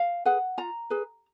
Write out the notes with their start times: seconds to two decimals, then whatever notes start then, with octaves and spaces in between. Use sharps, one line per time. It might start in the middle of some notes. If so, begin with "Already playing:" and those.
Already playing: F5
0.25 G#4 B4 F#5
0.58 F4 A#5
0.90 G#4 B4